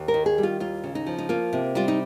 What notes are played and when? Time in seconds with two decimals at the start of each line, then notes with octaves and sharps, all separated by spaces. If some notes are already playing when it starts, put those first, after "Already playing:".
Already playing: D#2
0.08 A#4
0.14 D#3
0.26 G#4
0.38 G3
0.43 F4
0.60 D#2 F4
0.84 C#3
0.95 D#4
1.06 F3
1.19 D#4
1.29 A#3 F4
1.53 C3
1.75 G3 F4
1.88 D#4